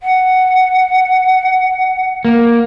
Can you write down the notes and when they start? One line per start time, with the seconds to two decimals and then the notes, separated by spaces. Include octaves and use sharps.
0.02 F#5
2.25 A#3